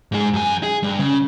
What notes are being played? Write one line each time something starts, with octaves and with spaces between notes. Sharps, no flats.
G#2 G#4
F#2 G#5
G#4
G2
C#3